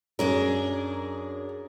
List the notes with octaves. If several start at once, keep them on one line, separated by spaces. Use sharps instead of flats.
F#2 D4 G#4 A#4